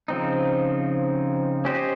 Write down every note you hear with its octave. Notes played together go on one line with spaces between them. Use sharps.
C#3 F3 C4 D#4
C#4 G4 C5 D#5